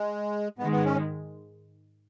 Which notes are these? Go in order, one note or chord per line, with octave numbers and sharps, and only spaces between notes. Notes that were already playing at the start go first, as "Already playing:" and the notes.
Already playing: G#3
G#2 D#3 G#3 B3
B3
C#4